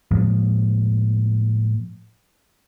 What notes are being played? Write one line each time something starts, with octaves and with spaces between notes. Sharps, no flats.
A2 F3 G#3 A#3